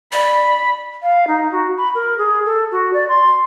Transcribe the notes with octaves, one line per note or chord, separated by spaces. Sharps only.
D5 B5
F5
D#4
F#4
B5
A#4
G#4
A4
F#4
D5
C6